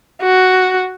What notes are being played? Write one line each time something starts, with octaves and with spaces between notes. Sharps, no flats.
F#4